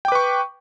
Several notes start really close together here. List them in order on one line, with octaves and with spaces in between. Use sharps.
G5 D6 B4 C#6